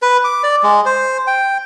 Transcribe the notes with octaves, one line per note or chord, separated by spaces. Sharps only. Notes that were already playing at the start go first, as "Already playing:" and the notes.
B4
D6
D5
G#3
C5
G5